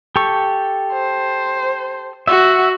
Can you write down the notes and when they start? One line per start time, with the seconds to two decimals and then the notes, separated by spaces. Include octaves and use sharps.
0.16 G4 A4 C#6
0.93 C5
2.27 F#4 E5